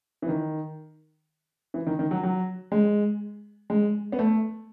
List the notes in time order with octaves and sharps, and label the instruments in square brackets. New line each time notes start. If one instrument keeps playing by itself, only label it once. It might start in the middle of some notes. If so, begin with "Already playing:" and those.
[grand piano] E3
D#3
E3
D#3
D#3
F#3
F#3
G#3
G#3
B3
A3